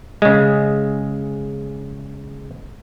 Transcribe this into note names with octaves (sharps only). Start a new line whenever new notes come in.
C#3 G#3